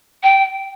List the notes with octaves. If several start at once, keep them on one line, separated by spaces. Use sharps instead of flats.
G5